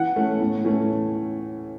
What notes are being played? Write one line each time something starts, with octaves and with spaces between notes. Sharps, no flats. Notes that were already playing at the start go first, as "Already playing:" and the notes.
Already playing: E3 F#5
A3 C#4
A2
E3 A3 C#4